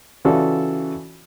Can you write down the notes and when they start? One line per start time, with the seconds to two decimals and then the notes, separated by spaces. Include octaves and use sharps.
0.25 C#3 E3 F4 F#4 A4 D5